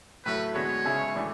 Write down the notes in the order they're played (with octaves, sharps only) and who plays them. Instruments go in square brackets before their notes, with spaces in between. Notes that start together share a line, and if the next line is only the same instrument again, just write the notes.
[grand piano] A2 F#3 A3 [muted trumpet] B4
[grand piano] D3 G#3 B3 F#4 [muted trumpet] C#5
[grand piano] C#3 G#3 C#4 E4 G#4
A2 E3 A3 D4